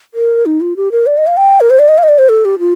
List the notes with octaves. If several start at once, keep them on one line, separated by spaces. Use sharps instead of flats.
A#4
D#4
F4
G4
A#4
D5
D#5
F5
G5
A#4
C5
D5
D#5
F5
D#5
D5
C5
A4
G4
F4